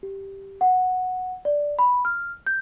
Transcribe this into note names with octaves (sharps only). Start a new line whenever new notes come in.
G4
F#5
D5
B5
F6
G6